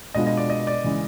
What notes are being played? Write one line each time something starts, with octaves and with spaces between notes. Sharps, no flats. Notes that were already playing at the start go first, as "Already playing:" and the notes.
B2 G#3 B3 D4 F4 D#5
D#5
D5
D#5
D5
C#3 E3 G#3